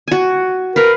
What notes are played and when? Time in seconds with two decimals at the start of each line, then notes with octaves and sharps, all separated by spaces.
0.08 F#4 G#5
0.76 A#4 B4 F5